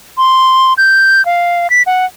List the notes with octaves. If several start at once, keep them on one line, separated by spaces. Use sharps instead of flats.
C6
G6
F5
B6
F#5